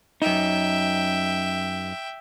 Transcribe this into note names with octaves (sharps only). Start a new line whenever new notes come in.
F#2 D#4 E5 G5